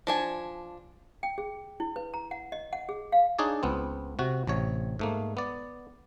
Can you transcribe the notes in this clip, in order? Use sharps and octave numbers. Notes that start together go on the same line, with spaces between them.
F3 D4 G#5
G5
G#4
E4
B4
A#5
F#5
D#5
F#5
G#4
F5
D4 D#4 G#4 C#5 D5
C#2 B3 C4
C3 F#4
A1 C3 C#5
G#2 A3 A#3
B3 D5